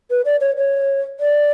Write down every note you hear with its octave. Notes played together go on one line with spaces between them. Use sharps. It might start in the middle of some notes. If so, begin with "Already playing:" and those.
B4
D5
C#5
C#5
D5